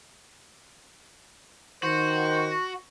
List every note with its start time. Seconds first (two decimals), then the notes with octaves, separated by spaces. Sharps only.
1.83 D#3 F#4 C5